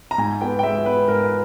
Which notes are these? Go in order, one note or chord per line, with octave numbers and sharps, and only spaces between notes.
A#5
G#2 G#5
B3 G5
G5
G#3 E5
B3 B4
G#2 A#4
B4